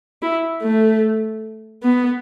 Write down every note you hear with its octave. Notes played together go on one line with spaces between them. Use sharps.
E4
A3
B3